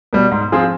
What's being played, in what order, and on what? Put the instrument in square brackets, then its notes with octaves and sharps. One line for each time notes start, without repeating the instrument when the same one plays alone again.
[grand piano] B2 G3
G#2
F3 C4 F4 G#4